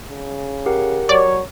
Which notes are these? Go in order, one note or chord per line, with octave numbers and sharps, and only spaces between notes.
C#3
G4 A#4 F#5
F#3 C#5 D5